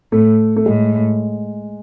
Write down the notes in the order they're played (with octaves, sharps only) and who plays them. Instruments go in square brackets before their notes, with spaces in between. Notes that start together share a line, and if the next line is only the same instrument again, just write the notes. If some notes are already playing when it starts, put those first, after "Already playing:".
[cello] A2 [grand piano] A3
[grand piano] A3
[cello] A2 [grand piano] G#3